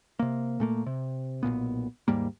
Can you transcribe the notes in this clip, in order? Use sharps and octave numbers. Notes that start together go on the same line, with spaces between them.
C3 A#3
A#2 A3 A#3
C3
B1 F#2 A#2 B3
D#2 G#2 G3 A#3